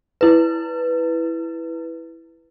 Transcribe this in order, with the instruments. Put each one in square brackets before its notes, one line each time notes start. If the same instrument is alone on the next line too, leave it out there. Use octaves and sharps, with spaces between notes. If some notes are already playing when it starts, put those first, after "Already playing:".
[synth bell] E4 B4